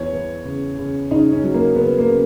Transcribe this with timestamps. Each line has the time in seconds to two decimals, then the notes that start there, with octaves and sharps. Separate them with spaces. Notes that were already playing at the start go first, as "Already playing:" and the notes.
Already playing: E2 C#5
0.13 E2
0.45 C#3
0.79 C#3
1.11 C#3 D#4
1.32 C#4
1.44 F#3
1.54 A#3
1.76 C#3 B3
1.98 A#3
2.09 C#3